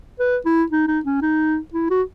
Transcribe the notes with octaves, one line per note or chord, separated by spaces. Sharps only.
B4
E4
D#4
D#4
C#4
D#4
E4
F#4